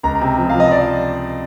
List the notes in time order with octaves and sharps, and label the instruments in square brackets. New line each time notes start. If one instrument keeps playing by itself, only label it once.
[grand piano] C#2 A#5
A#5
C3
F3
F3 F5
D#5
D5